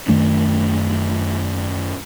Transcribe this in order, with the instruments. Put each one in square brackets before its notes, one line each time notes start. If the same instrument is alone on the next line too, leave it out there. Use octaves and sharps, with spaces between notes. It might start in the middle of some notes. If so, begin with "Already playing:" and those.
[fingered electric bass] F#2 D#3 A3 D4